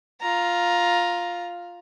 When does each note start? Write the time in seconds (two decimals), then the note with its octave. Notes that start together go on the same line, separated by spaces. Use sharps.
0.21 F4 A#5